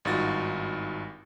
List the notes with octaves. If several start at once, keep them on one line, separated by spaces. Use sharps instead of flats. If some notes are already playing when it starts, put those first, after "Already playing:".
G#1 G2 D#4 F4 F#4 A6